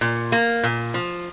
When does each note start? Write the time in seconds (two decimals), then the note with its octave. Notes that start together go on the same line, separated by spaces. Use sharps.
0.01 A#2
0.32 A#3
0.64 A#2
0.94 F3